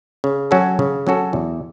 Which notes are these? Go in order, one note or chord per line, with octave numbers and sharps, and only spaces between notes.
C#3
F#3 C#4 F#4 A4
C#3
F#3 C#4 F#4 A4
E2